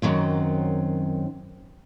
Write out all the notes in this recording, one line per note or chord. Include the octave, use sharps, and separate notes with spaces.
F#2 D#3 F#3 C4